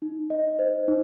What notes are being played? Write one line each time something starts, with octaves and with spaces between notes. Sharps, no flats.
D#4
D#5
C5
D#4